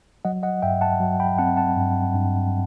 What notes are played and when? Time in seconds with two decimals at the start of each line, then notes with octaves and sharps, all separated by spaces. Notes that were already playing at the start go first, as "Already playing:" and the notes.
0.25 F#3 D#5 F#5
0.43 D#5 F#5
0.62 G2 E5 G5
0.81 F#5 A5
1.00 F#3
1.20 G5 B5
1.38 C4 F#5 A5
1.57 F#5 A5
1.76 G2
2.14 G2